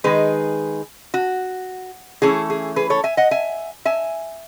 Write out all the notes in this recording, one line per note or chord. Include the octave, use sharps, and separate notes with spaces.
D#3 G#3 D#4 G#4 B4
F#4
E3 A3 C#4 E4 G#4
G#4
G#4 B4
A4 C#5
E5 G#5
D#5 F#5
E5 G#5
E5 G#5